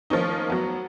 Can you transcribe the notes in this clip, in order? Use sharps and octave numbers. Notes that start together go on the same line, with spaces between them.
D#3 F3 A#3 C#4 D#4
F#3 B3